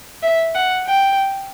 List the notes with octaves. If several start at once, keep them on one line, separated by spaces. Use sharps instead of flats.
E5
F#5
G5